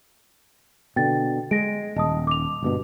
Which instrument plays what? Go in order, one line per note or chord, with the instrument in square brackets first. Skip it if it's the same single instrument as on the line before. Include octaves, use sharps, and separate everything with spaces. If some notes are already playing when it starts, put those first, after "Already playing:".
[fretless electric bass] B2 D3 [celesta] G5 A6
[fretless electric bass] G#3 [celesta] A#6 D7
[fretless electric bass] D#1 [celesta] D#5 A5 D#6
[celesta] D6 F7
[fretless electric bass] G1 G2 B2